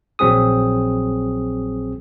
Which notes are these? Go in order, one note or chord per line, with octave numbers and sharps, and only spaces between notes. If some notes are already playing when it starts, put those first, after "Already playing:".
A#1 F#3 C4 G#4 D#6